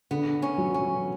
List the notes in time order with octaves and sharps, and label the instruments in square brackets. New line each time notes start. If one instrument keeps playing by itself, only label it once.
[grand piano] D3 [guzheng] B3
[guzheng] C#4
[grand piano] F#3
[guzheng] C#4